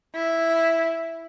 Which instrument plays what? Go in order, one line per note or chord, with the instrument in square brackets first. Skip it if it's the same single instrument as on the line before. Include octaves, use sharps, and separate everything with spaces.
[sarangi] E4